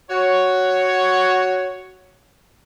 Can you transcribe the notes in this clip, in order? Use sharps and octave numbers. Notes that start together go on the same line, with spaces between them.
F#4 C#5